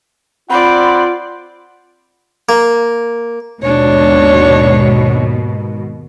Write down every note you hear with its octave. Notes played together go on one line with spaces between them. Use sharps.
C4 F4 D5 F#5 B5
A#3
D#2 G#2 B2 D4 C#5